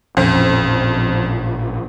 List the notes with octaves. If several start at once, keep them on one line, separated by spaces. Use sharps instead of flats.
A1 F2 A#2 C#4